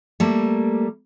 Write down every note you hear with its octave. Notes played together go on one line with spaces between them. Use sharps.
G3 A3 A#3